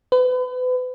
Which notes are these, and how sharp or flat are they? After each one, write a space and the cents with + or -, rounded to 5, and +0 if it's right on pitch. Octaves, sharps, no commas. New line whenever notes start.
B4 +35